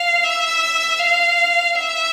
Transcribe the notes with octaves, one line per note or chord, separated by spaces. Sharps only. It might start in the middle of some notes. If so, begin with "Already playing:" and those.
Already playing: F5
E5
F5
E5